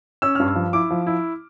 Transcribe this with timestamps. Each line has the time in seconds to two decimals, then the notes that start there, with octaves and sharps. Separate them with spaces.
0.22 C#4 E6
0.35 G2 F6
0.47 E6
0.55 F3
0.73 E4 D6
0.91 F3
1.07 E4